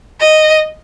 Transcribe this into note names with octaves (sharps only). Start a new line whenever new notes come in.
D#5